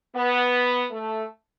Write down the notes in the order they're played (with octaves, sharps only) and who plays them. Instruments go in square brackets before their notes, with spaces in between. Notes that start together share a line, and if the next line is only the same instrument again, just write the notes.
[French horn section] B3
A3